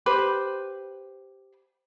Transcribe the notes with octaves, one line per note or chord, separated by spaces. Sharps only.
G4 B4 C5